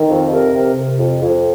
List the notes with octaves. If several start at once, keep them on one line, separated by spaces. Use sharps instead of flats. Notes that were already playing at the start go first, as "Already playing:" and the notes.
Already playing: D#3
F2
C3 A#4
C3
C3
F2
F2